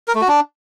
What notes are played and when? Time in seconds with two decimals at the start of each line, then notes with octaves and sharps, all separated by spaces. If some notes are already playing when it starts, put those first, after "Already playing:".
0.08 A#4
0.15 A3
0.21 F#4
0.28 D4